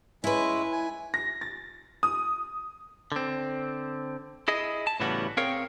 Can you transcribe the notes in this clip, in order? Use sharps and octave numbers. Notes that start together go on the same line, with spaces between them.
G#3 C#4 E4 B4 E5
G#5
A#6
A6
D#6
D3 C4
E4 G#4 D#5
A5
A2 C#3 E3 G3 B3 F#4
C4 G#4 A#4 C#5 F5 G5